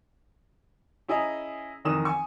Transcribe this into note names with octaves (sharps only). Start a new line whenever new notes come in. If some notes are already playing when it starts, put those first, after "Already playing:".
C#4 E4 G#4 D#5 A#5
F1 D#3 E3 A#4 D#6 E7
G#5 C#6